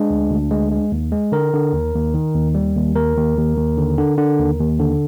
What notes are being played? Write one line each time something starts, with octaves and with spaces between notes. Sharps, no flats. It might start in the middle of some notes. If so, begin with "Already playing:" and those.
Already playing: G#3 D4
D2
D2
G#3
G#3
D#2
G#3
D3 A#4
D3
D#2
D#2
D#3
D#2
G3
D#2
D#2 A#4
D#2
D#2
D#2
D3
D3
D3
D#2
D#2
D3